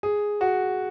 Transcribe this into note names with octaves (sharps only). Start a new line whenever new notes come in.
G#4
F#4